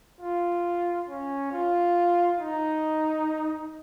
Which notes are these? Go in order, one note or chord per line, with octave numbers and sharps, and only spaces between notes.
F4
C#4
F4
D#4